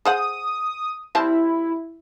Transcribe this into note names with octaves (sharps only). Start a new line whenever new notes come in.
G#4 C5 F#5 D#6
G3 C4 E4 A5